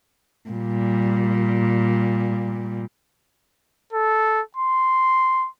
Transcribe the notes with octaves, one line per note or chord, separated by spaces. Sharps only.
A#2 G3
A4
C6